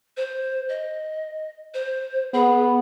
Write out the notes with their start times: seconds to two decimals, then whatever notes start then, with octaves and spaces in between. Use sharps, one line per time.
0.17 C5
0.69 D#5
1.74 C5
2.33 B3 G#4